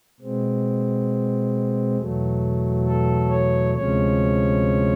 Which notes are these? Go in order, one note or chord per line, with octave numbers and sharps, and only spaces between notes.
B2 G#3 C4
E2 B2 F#3 A3
A4
C#5
D2 C3 F3 G#3 C#4 C#5